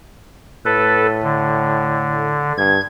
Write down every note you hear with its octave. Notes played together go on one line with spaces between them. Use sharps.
A2 A4 B4
D3
G2 G#6